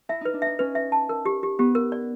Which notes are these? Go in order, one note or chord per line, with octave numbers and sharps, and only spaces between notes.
E4 E5
D#4 B4
D4
D#4 E5
C#4 B4
E5
A5
A#4
G4
G4
B3 G4
A#4
D5